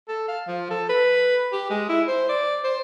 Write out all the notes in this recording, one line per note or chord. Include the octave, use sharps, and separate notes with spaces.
A4
F5
F3
A4
B4
G4
G#3
E4
C5
D5
C5